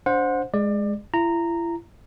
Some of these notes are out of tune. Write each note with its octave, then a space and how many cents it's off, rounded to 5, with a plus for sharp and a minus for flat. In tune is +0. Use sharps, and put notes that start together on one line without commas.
D4 -20 C5 +0 F#5 -30
G#3 +0 D5 +25
E4 +40 A#5 -10